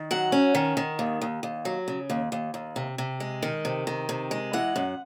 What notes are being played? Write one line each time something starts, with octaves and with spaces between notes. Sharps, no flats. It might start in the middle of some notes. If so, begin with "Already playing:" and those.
Already playing: D#3
F#3 F#5
C#4
D#3
D#3
D#2
D#2
D#2
F#3
C#3
D#2
D#2
D#2
C3
C3
G#3
D#3
C3
D#3
C3
G#3
E3 F#5
F#2